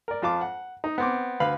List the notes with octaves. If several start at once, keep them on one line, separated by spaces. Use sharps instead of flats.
A#4 D5
F2 F4 A5 D6
F#5
D#4
B3 C4 D6
D2 B4 F5 B5